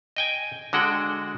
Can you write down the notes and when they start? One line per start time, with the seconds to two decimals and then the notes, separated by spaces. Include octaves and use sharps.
0.16 D#5 G5 G#5
0.73 D3 G#3 F#4 F#5 G5